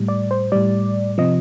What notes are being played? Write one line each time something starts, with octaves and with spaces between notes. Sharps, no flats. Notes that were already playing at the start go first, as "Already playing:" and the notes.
Already playing: A2 G3
D5
C5
A2 G3 D5
C3 F3 D#5